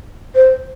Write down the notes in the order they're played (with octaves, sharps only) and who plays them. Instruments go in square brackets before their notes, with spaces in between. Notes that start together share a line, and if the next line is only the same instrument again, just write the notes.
[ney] C5